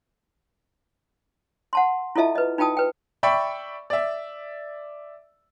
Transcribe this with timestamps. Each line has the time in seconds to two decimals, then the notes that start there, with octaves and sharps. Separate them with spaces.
1.73 F#5 A5 C6
2.16 E4 F4 A4 D#5 E5 A5
2.35 B4 D#5
2.58 D#4 F4 G5 A5 D#6
2.77 B4 G5
3.23 D5 E5 G5 B5 C#6
3.90 D5 E5